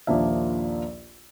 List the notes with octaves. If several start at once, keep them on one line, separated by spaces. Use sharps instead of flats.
A#1 D#2 F3 A#3 D4 E5